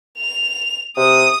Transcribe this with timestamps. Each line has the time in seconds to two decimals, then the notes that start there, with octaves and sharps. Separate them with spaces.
0.18 F7
0.97 C3 D#6